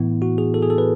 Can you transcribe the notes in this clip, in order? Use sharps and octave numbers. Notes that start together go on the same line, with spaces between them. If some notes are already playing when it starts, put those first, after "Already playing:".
Already playing: A2 E3 B3 E4
F#4
G#4
A4
G#4
A4
B4